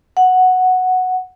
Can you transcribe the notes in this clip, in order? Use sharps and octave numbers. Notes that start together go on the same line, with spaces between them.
F#5